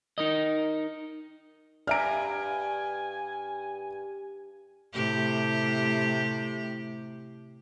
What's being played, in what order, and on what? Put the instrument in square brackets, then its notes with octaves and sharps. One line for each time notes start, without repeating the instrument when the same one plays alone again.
[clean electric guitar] D#4 A#4 D#5
[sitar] G2 [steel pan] D5 E5 A#5 [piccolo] G#5 [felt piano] F6 D7
[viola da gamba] A2 C3 G4